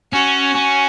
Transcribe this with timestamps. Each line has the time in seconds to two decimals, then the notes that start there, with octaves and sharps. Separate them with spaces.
0.13 C#4 F#4
0.55 C#4